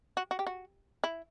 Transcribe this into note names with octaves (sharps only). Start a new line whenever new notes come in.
F#4
F#4
G4
F#4
E4